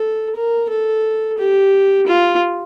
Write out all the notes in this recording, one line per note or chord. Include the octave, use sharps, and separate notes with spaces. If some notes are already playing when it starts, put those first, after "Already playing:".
Already playing: A4
A#4
A4
G4
F4